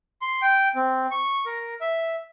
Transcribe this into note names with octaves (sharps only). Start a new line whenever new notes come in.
C6
G5
C4
C#6
A#4
E5